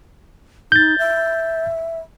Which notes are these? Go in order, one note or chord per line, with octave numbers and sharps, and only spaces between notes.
D#4 G6 A6
E5